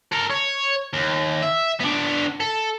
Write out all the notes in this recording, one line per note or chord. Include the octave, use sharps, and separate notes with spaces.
A4 A#4
C#5
D#2
E5
B3 D4
A4